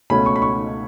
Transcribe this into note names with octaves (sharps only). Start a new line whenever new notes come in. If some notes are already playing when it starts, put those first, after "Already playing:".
C#2 B2 A3 C#4 B5
C#6
B5
C#6